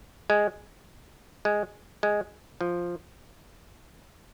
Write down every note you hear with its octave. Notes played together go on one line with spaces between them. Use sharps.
G#3
G#3
G#3
F3